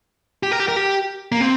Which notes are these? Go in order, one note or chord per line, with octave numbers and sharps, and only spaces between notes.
G4
A#4
G4
A#4
G4
A#3
C4